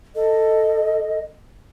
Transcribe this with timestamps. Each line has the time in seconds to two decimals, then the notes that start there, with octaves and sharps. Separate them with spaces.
0.15 A4 D#5